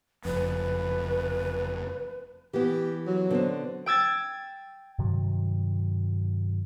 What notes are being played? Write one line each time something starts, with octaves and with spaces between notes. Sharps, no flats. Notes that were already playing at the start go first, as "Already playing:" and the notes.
F#1 F2 B4
E3 B3 G4
F#3
D3 B3 C4
G5 E6 G#6 A6
G2 C3 D#3 F#3